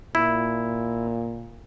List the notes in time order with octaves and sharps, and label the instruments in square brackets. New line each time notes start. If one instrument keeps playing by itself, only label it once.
[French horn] A#2 [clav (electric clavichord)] E4